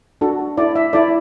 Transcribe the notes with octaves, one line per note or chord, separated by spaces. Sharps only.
D4 F#4 A4
E4 A4 D5
E5
E4 A4 D5